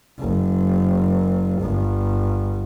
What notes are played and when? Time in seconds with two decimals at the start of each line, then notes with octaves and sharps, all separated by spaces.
0.19 F#1
1.61 G1